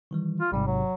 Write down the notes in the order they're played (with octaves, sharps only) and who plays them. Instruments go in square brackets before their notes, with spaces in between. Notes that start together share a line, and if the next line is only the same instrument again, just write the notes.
[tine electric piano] D#3 E3 G3
[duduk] F4
[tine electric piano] A1 G#2 C3 [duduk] G3
[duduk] F#3